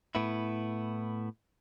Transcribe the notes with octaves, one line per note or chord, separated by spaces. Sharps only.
A2 B3 E4